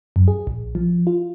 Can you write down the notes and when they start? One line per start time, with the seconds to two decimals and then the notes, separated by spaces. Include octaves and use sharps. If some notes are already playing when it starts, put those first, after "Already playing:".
0.16 F#2
0.28 G#4
0.47 A#1
0.75 F3
1.07 F4